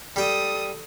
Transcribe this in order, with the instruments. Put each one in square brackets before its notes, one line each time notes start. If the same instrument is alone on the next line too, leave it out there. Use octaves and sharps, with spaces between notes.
[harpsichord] G3 G5 [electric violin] A4 D#6